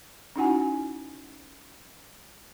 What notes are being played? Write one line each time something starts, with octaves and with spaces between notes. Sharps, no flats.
C#4 D#4 E4 F#4 F#5 G#5